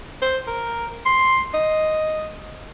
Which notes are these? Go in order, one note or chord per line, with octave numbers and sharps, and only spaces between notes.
C5
A#4
C6
D#5